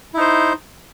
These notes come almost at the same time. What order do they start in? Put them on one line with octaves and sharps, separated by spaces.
E4 D#4 C5